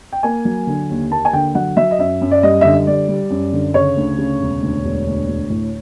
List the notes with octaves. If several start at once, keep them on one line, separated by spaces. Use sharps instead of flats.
G5
A#3 G#5
F#3
D3
D#2
A#3 A5
G#5
D3 G5
F#3 F#5
F#3 E5
D#5
F#2 E5
F#2
D5
G3 D#5
D3 E5
D#5
G3 D5
G3
F#2
D3
C#3 C#5
D2
C#3
E1
D2
E1
D2
D2
A2